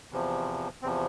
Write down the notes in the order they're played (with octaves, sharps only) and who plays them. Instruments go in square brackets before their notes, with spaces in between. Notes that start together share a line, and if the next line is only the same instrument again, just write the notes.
[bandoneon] E2 C3 F3
E2 C4
C3 F3